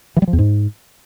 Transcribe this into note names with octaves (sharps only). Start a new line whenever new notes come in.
E3
G3
F3
E2
G#2